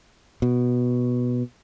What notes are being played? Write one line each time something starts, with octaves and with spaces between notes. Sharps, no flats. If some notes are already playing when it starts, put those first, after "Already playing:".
B2